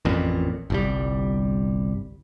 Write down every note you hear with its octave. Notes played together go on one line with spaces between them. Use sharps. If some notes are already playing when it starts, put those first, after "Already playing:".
A1 F2 A#2
G1 C2 G3